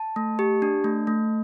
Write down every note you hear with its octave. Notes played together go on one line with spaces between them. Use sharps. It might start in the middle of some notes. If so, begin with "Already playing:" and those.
Already playing: A5
A3
G4
D4
A3
A3